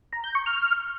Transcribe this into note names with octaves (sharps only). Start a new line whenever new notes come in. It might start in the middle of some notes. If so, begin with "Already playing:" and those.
A#5
G6
C#6
F6